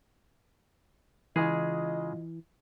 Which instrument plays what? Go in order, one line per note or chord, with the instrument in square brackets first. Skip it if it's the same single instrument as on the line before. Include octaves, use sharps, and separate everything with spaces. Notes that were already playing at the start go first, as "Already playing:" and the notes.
[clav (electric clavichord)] C#3 G#3 G#4 [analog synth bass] E3 [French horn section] F4 D#5